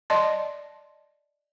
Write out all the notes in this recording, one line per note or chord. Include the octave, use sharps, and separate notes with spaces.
D5 D#5 A5 C6